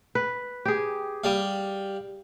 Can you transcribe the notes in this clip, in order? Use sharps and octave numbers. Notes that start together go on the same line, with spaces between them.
B4
G4 G#4
G3 F5